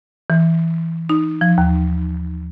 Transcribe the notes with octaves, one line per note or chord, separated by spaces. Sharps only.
E3
D#4
F3
D#2